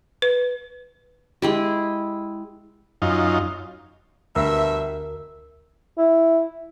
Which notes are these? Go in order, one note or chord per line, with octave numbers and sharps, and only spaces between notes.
B4
G#3 E4 G4
F#2 D#4 F4
D2 G2 B2 A#4 E5 E6
E4